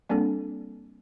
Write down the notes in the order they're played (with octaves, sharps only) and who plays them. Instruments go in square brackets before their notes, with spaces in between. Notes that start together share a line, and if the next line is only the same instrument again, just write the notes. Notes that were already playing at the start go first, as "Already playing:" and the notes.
[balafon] G3 A#3 C4 D4 A4